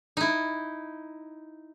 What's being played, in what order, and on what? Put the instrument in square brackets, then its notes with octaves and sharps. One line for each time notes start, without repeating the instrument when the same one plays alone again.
[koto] D#4 E4